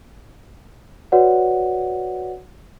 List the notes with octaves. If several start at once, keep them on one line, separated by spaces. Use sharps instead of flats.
F#4 B4 C#5 D5 F#5